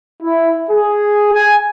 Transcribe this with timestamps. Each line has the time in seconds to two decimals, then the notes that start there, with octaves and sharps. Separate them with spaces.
0.22 E4
0.71 G#4
1.33 G#5